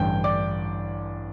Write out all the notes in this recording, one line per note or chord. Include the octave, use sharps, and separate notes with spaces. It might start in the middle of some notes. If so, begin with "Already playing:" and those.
Already playing: A1 G2 D3 G5 G6
D5 D6